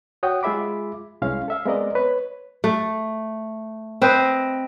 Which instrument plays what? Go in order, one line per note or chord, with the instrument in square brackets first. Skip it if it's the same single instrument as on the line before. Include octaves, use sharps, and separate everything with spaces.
[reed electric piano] F#4 C#5 F#5 G5 D#6
G#3 F4 G#4 E5 B5 D6
C2 G#3 C#4 E4 F5
A4 E5 F5
G#3 B3 C4 A#4 D5 D#5
B4 C#5
[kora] A3
C4 B4 C5 D#5